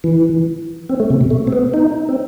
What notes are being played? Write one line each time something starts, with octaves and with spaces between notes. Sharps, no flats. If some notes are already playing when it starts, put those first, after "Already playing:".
E3
C4
A3
C3
B2
A3
C4
B3
D#4
C4